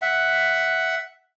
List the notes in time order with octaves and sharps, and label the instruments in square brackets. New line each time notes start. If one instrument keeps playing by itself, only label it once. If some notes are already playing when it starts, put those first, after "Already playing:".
[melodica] E5 F#5